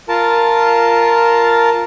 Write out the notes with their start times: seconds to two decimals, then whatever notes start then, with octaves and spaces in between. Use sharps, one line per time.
0.09 F4 A#4 A5